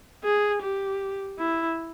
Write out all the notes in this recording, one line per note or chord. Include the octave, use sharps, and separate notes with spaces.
G#4
G4
E4